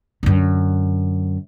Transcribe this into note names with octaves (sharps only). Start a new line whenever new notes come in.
F#2 D3